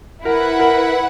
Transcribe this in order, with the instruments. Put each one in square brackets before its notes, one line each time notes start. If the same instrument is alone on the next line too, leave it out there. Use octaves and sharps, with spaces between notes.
[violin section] E4 B4 F#5 [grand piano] A#4
[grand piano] A#4